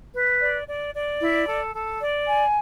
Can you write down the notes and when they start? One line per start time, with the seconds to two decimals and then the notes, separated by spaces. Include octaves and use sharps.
0.14 B4
0.41 D5
0.68 D5
0.95 D5
1.21 E4
1.47 A4
1.74 A4
2.00 D5
2.27 G#5